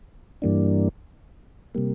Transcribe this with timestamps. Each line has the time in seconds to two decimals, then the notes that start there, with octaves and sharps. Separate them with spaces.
0.42 G2 E3 G3 A#3 D4
1.75 C3 G3 A#3